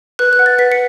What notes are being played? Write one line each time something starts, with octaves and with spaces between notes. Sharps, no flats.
B4 F#6
F#6
F#5
A6
B4 B6
C#7